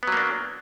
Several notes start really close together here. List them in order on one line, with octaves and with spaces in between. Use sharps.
B3 F#3 A#3 D4